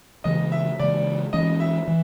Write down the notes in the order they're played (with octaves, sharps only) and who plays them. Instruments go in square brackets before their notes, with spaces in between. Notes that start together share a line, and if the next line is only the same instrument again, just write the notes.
[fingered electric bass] C#3 E3 G#3 [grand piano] D#5
[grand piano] E5
[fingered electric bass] C#3 E3 G#3 [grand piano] D5
[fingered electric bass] E3 G#3 C#4 [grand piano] D#5
[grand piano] E5
[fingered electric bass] E3